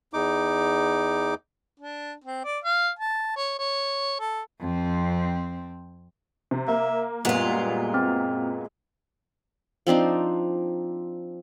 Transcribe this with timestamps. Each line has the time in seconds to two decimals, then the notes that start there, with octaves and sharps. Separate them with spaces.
0.13 E2 D#4 D6
1.80 D4
2.24 C4
2.45 D5
2.64 F5
2.99 A5
3.36 C#5
3.59 C#5
4.19 A4
4.60 F2 C4
6.51 C3
6.68 A#3 E5
7.25 F#2 A#2 G3 G#3 B3 F4
7.94 C4
9.87 F3 C4 D4 D#4